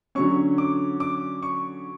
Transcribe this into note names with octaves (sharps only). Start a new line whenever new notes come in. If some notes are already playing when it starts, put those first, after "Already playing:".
D3 F#3 C#4 C#6
D6
D6
C#6